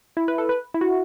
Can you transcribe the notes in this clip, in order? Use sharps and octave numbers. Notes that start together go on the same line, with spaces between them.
E4
B4
A4
B4
E4
F#4